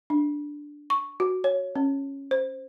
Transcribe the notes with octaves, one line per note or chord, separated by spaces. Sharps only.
D4
C#6
F#4
C#5
C#4
C5